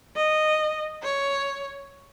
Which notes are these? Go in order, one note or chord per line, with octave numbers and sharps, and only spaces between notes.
D#5
C#5